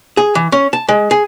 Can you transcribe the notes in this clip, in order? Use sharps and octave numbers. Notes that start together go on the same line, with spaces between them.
G#4
E3
C#4
A5
G#3
G#4